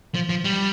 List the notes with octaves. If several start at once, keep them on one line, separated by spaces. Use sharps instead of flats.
F3
F3
G3